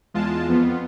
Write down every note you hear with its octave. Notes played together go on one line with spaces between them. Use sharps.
E2 G#3 F4 A5
F2 B3 F4